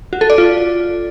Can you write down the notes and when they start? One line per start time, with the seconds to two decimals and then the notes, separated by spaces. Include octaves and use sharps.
0.13 F#4
0.21 A4
0.30 D5
0.38 F4